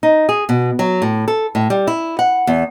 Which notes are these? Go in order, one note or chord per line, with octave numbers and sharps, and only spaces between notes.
D#4
G#4
B2
F#3
A2
A4
A2
G3
E4
F#5
E2